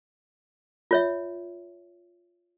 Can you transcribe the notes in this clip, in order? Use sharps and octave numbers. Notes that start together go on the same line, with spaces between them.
F4 C#5 E5